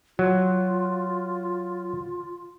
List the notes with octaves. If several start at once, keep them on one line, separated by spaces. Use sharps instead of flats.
F#3 F4